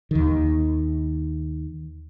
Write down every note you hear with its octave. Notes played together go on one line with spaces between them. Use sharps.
D#2 D#3